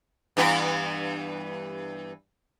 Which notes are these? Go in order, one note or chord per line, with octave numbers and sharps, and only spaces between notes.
G2 E3 B3